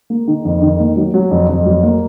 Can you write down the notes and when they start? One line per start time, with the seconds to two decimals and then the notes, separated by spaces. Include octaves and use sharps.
0.10 A#3
0.28 D#3
0.45 F2
0.62 D#3
0.80 A#3
0.96 F#3
1.14 F#3
1.31 F2
1.49 F2
1.66 F#3
1.83 A#3